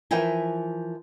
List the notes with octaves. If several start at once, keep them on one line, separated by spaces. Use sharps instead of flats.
E3 F3 A#4 E5 G5 G#5